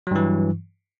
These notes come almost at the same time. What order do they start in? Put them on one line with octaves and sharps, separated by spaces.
F#3 G2 E3